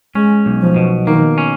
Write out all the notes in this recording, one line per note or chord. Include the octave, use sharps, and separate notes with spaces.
G#3 C#4
B1
F3
B2
D#3 A#3
C#4